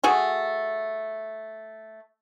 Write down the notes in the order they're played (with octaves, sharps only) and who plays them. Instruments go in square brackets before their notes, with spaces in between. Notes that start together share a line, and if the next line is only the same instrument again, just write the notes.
[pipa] A3 F#4 G#4